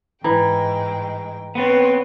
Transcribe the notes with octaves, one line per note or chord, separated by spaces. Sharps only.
G#2 E3 G#3 G5 A#5
B3 C4 B4 C#5 C6